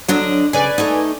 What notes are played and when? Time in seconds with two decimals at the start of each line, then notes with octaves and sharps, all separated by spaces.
0.08 D3 F#3 D4 D#5
0.53 C#3 B4 D5 G#5
0.78 A3 D#4